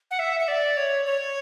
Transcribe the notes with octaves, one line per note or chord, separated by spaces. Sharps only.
F#5
E5
E5
D5
C#5
C#5